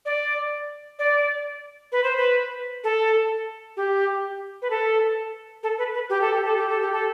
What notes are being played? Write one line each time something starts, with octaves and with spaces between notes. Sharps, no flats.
D5
D5
B4
C5
B4
A4
G4
B4
A4
A4
B4
B4
G4
A4
G4
A4
G4
A4
G4
A4